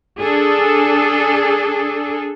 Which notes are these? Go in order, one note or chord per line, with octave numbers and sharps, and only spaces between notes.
D4 G#4 A4